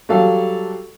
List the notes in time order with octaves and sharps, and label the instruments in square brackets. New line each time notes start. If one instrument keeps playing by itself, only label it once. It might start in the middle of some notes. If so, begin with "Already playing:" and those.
[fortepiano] F#3 G3 G4 A4 F5